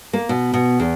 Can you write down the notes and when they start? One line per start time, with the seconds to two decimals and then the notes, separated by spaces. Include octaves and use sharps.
0.13 A#3
0.29 B2
0.54 B2
0.80 E2